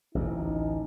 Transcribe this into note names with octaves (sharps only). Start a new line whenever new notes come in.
A1 D2 D#4